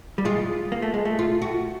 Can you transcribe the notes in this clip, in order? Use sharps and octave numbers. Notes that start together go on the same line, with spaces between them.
G3
G#3 F4
A#3
A3
G#3
A3
F4
F#4